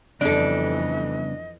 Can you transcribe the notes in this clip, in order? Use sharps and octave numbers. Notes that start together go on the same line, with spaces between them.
F2 C#3 E3 G3 B3 D4 A4 D#5